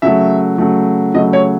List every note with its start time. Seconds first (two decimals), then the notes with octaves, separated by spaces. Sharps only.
0.02 C#3 F#3 A3 E5
0.58 C#3 F#3 A3
1.14 C#3 F#3 A3 D#5
1.33 C#5